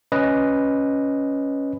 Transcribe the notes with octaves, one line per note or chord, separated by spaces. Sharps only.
C#4 B4 D#5